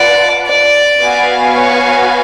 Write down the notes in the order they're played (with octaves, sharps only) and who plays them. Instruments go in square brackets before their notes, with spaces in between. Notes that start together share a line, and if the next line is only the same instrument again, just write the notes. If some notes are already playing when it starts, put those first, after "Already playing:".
Already playing: [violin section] F4 B4 F#5 A5 [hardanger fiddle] D5
[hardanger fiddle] D5
[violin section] B3 F#4 B4 F5 G#5
[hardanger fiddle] C#5